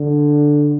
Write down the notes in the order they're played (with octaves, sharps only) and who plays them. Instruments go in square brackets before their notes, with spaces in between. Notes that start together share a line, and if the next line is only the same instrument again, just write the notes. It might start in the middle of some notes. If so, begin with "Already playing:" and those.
Already playing: [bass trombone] D3